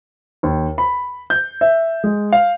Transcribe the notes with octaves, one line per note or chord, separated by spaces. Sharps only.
D#2
B5
G6
E5
G#3
F5